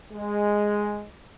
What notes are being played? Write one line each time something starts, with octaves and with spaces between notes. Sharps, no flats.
G#3